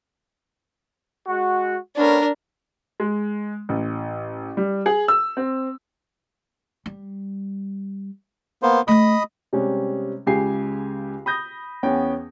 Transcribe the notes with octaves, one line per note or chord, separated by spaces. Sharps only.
G#3 F#4
A3 B3 C#4 D4 A#4
G#3
A1
G3
G#4
E6
C4
G3
A#3 B3 C5
A3 C#4 D#5 B5 D#6
C3 G3 G#3 C#4
C#2 C#3 G4 G#5 C7
B5 D#6 G6 A#6
E2 B3 C#4 G5